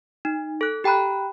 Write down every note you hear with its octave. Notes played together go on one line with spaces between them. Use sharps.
D#4
A4 F#6
G4 G5 A#5 B5 F#6